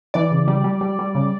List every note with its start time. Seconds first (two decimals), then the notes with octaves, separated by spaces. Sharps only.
0.14 E3 D5
0.32 C#3
0.48 G3
0.64 G3
0.81 G3
0.99 G3
1.15 C#3